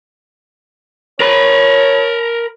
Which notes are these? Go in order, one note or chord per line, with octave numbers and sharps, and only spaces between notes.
A#4 C#5 B5